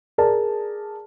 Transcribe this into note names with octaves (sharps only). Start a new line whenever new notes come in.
G#4 A#4 D5 A5